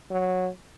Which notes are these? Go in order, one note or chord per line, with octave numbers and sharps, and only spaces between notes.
F#3